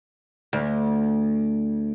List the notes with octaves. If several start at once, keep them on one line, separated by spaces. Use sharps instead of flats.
D2